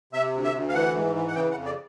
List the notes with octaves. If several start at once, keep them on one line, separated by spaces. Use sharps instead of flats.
C3 E5
D2
E5
D2
F5
E3 F#5
G#2
E3
F#5
C#3 G5
F#5
F2
D5